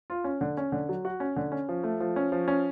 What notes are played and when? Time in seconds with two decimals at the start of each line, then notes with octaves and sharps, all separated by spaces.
0.10 F4
0.24 C#4
0.41 D3
0.57 C#4
0.72 D3
0.89 F#3
1.05 F#4
1.20 C#4
1.36 D3
1.52 C#4
1.69 F3
1.84 A3
2.00 F3
2.16 C#4
2.32 F3
2.48 C#4